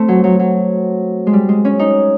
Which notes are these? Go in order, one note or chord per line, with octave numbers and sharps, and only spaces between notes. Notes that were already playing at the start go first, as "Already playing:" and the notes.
Already playing: A3 C4
F#3
F#3
F#3
G#3
G3
G#3
C#4
D#4